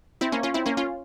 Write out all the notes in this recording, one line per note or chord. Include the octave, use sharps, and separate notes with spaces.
C4 E4
A#3 C#4
C#4 F4
C4 E4
A#3 C#4
C#4 F4